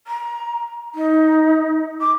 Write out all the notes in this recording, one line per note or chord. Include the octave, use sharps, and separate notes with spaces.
A#5
D#4
D6